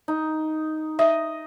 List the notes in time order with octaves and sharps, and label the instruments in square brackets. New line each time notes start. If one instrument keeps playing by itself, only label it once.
[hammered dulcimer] D#4
[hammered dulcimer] D#5 [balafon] E5